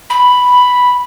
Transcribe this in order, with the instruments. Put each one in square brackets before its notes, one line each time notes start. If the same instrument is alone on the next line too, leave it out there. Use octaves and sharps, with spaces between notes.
[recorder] B5